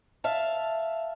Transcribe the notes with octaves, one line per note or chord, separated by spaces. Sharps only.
E5 F5 A5